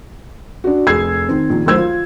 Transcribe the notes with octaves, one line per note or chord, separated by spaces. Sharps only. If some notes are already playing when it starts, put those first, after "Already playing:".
D4 F#4
F1 G#4 E6 G#6 C7
D#3 C4
A#1 D#3
D2 D#3 F#3 C5 E6 G#6
F4